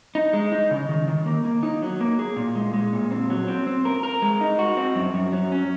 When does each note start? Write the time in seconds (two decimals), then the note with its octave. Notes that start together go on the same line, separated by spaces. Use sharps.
0.15 D#4
0.33 G#3
0.52 D#4
0.71 C#3
0.89 D#3
1.08 D#3
1.26 A#3
1.45 A#3
1.63 D#4
1.82 F#3
2.01 A#3
2.19 G#4
2.37 A#2
2.55 G#3
2.74 G#3
2.93 A#2
3.11 C4
3.30 F#3
3.48 C4
3.67 C4
3.85 A#4
4.03 A#4
4.22 G#3
4.41 D#4
4.59 F#4
4.77 C4
4.95 F#2
5.14 F#2
5.32 F#3
5.52 C#4